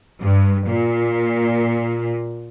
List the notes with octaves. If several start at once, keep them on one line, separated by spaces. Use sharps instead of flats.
G2
A#2